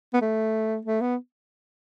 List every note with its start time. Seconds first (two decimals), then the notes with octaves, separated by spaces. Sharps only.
0.13 B3
0.21 A3
0.85 A3
1.01 B3